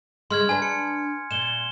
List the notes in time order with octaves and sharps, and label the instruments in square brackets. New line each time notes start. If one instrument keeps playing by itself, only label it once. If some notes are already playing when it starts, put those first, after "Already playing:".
[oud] C#3 G#3 [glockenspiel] C6 F6 G#6
[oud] D4 B4 [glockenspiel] G#5
[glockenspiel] C#7
[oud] A#2 [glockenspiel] E7 G7